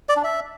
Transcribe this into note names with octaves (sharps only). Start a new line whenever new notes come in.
D5
D4
E5